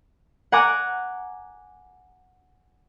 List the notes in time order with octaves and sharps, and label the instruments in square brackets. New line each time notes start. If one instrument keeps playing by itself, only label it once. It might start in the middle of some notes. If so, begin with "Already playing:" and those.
[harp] F#5 G#5 A#5 D6 F#6